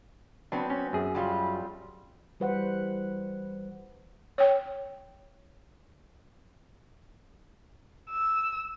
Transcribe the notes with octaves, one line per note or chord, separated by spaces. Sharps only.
F#3 B3 C4 D4
C#4
F#2 G#4
F#3 G3 F4
E3 G3 B4 C5 F#5
C#5 G5
E6